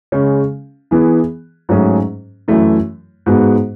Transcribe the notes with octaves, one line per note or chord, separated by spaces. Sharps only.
C#3 G#3 C#4
E3 B3 E4 G#4
G#2 F#3 A3 C#4 G#4
F#2 E3 A3 E4
G#2 G#3 B3 F#4